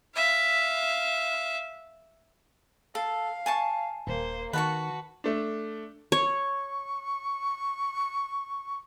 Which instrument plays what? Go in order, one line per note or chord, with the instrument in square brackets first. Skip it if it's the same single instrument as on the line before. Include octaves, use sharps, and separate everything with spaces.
[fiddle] E5 F5
[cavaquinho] A4 [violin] F5
[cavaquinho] G#5 A5 C#6
[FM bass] D#1 [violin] A#3 C5
[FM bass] D#3 [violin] F#4 [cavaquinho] B4 A5 C#6
[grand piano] A3 D4
[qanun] C#5 [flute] C#6